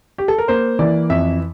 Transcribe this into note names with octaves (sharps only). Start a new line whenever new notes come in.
G4
A4
A#4
A#3 C5
E3 D5
F2 E5